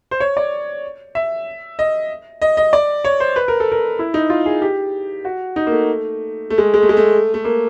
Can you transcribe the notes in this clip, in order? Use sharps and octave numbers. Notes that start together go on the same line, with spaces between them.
C5
C#5
D5
E5
D#5
D#5
D#5
D5
C#5
C5
B4
A#4
A4
A#4
E4
D#4
F4
G#4
G4
F#4
D#4
A#3
A3
A3
G#3
G#3
A3
G#3
A3
A3
A#3